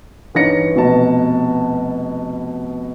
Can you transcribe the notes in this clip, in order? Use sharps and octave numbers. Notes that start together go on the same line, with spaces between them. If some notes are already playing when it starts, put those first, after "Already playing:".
G2 E3 C#4 D#4 A#6 C#7
F1 B2 B3 A5